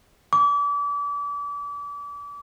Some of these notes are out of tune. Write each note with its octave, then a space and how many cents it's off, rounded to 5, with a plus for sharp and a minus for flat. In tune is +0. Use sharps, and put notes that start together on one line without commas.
D6 -35